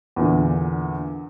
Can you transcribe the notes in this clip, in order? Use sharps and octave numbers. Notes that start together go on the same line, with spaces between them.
E2 A#2 D3